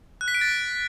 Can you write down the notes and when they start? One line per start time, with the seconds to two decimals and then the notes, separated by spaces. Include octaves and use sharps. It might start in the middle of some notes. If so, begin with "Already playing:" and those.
0.21 F#6
0.28 B6
0.35 D7
0.41 A6